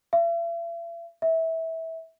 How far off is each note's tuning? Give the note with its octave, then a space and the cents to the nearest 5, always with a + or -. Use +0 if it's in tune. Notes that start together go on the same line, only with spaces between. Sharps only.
E5 +45
E5 -20